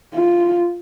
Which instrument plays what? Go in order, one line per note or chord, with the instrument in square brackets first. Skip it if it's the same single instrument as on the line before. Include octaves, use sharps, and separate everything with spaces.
[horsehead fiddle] F4